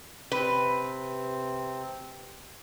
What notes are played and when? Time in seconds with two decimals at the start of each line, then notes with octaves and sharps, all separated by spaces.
0.32 C3 C4 B4